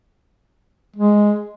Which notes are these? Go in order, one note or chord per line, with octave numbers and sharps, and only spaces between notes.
G#3